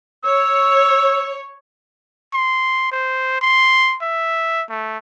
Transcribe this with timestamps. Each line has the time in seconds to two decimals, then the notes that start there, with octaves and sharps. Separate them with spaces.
0.24 C#5 E6
2.33 C6
2.92 C5
3.41 C6
4.02 E5
4.69 A3